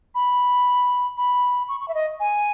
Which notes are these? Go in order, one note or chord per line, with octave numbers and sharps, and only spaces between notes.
B5
B5
C#6
C#6
E5
D#5
G#5